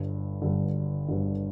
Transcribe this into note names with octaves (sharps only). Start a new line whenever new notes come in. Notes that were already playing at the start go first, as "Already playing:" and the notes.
Already playing: G1 G2 D3
G1 G2 D3
G1 G2 D3